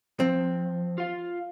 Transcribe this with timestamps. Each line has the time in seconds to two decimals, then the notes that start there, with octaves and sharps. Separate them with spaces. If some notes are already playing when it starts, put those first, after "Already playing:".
0.20 F3 C4
0.98 F4 F5